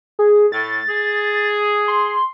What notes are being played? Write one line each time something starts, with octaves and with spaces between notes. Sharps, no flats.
G#4
A2 A6
G#4
C6